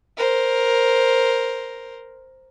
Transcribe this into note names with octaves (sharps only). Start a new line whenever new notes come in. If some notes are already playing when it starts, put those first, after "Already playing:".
A#4 C5